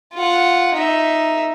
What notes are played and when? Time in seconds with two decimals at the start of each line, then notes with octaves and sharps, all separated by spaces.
0.14 F4 F#5
0.74 D#4 E5